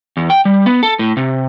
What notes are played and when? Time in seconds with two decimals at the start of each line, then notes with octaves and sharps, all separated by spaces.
0.17 E2
0.30 G5
0.45 G3
0.66 B3
0.83 A4
0.99 A2
1.17 C3